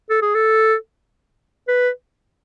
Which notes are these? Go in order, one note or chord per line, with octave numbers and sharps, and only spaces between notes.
A4
G#4
A4
B4